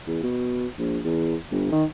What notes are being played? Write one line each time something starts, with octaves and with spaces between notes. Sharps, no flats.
E2
B2
A#1
E2
G1
D#3